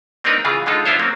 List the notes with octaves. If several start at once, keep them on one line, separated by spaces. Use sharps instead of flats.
A#3 C4 D4 D#4 A#4 B4
C#3 E3 F4 G#4
D3 G#3 D#4 F4 A4
B3 D4 E4 F4 C5 C#5
F#3 A#3 C4 C#4